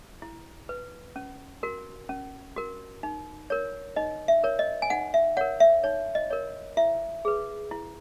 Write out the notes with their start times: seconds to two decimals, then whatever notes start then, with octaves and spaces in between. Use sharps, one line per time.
0.22 E4
0.69 B4
1.16 C#4
1.63 F#4 A#4
2.09 C#4
2.56 F#4 A#4
3.03 D#4
3.50 A#4 C#5
3.96 D#4 D#5
4.28 E5
4.44 A#4 C#5
4.59 D#5
4.82 G#5
4.90 D#4 F#5
5.14 E5
5.37 A#4 C#5 F#5
5.60 E5
5.84 D#4 C#5
6.15 D#5
6.31 A#4 C#5
6.77 E4 E5
7.25 G#4 B4
7.71 E4